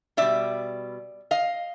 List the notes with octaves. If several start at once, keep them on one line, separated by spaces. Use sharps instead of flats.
B2 G3 D5 E5
D#5 F5